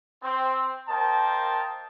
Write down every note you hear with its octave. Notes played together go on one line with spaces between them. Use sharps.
C4
A#3 A#4 C5 D#5 G5 A5